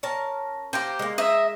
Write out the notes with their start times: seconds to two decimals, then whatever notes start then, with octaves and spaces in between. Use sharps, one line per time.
0.03 C#4 A#4 A5
0.73 A#3 G4 C5 G5
0.99 G#3 A#3
1.18 D#5 E5